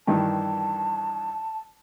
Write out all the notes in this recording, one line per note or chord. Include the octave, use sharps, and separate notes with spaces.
G2 D#3 E3 A5